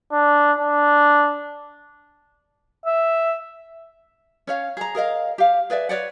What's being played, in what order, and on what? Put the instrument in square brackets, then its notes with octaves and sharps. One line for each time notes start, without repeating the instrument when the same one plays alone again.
[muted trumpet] D4
D4
[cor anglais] E5
[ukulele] C#4 C#5 F5
G#4 A#5
G#4 A#4 D#5 F5
G4 F5
G#4 B4 D5 E5
B4 C#5 D5 F#5